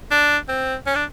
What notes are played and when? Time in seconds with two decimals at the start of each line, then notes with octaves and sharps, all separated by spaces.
0.11 D4
0.49 C4
0.86 C#4
0.95 D4